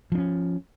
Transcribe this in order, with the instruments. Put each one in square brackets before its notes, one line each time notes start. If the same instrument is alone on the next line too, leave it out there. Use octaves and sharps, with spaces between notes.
[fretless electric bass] F3
D4
C#4